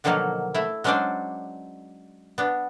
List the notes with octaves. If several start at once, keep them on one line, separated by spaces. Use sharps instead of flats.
B2 D3 D#3 F3 F#3 A#3
A3 E4
F#3 G#3 C#4 D4 C5 D5
B3 D4